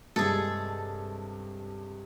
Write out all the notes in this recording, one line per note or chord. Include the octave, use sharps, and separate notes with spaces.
G2 C3 G#3 G#4 A4